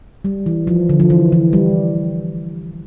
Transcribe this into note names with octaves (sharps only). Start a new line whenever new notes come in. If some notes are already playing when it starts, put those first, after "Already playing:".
G3
E3
F3
D3
F3
E3
E3
G3